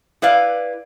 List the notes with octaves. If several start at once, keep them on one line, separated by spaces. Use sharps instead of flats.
E4 B4 D5 F5